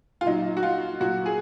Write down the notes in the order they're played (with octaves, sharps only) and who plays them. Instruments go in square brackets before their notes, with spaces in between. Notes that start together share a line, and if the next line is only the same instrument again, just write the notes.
[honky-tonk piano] F4
A#2 F#3 D#4
F#4
F4
A#2 F#3 F#4
G#4